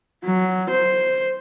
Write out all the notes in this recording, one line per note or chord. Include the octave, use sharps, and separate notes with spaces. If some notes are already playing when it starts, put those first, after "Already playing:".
F#3
C5